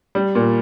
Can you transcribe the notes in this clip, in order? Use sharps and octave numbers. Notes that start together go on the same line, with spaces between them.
G3
A#2